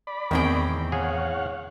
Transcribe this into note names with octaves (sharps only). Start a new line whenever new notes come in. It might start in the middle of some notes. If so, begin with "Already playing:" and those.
D5 B5
E2 A2 D#3 C4 G#4 G5
G#4 C#5 F5 F#5